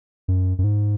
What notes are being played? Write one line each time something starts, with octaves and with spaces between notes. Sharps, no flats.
F#2
F#2
G#2